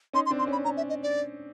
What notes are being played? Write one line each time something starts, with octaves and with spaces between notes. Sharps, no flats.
C#4 D#4 C6
C6
C4 D4
C6
C#4
B5
C#4 A#5
E5
D#5
D5